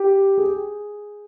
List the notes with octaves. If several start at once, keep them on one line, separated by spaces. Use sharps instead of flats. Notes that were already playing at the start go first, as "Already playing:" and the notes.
Already playing: G4
G#4